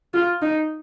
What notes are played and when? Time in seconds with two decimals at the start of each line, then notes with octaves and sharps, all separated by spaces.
0.14 F4
0.42 D#4